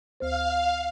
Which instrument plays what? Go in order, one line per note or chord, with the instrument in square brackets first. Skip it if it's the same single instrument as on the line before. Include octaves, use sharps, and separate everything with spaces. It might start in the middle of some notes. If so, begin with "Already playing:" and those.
[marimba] D2 C5 [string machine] F5